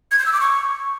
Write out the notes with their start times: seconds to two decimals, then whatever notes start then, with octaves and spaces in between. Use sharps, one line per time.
0.11 G#6
0.19 G6
0.26 E6
0.33 D6
0.40 C#6